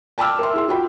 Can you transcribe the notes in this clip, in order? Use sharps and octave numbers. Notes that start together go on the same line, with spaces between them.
G5 A5 B5 D6 E6 F6
A#4 E5 C6
E4 G#4 C6
F4 F#4 G5 B5